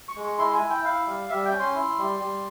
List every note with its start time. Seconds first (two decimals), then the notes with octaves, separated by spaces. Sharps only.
0.08 C#6
0.16 G#3
0.24 C#6
0.39 E4 C6
0.54 G#5
0.61 E4
0.70 G5
0.84 E4 F5
1.06 G3
1.29 G3 E5
1.45 G5
1.52 C#4
1.60 C6
1.75 E4
1.98 G3
2.20 G3